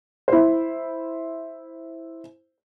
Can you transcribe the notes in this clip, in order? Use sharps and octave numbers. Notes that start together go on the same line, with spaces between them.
E4 C5